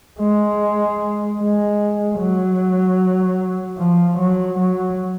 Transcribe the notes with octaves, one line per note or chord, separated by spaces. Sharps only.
G#3
G#3
F#3
F3
F#3
F#3